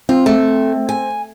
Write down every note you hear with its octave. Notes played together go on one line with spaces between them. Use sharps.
C4 F4
A3
G#5